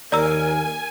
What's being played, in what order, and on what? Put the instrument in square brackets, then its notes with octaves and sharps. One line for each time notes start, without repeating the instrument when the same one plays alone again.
[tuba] D#2 [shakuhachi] A#4 [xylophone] D5 A#5 E6 [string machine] G#5